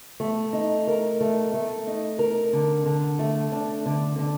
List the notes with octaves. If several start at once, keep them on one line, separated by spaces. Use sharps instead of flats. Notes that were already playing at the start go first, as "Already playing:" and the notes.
A3
D#4
A#4
A3
A3
D#4
A#4
D3
D3
A3
D4
D3
D3